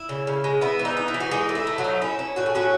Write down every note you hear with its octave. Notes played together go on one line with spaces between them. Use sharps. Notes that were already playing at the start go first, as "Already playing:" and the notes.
Already playing: E4
C#3
C#3
G#3
B3 E4
E3
D#4
D#4
E4
E3
F#4
G#3 D#4 G#4
A3
E4
A3
F#3 F#4
D#4
C#4 E4
C#4
A2 F#4
G#4
F#3 C#4 F#4